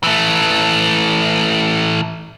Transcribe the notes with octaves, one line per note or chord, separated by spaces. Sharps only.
E3 A3